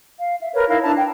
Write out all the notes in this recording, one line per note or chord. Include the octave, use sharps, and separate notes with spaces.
F5
E5
A#4 B4 C#5
D#4 E4 A#4 F5
D4 E4 A5 A#5
G5